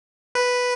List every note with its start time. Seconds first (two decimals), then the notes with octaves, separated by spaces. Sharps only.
0.35 B4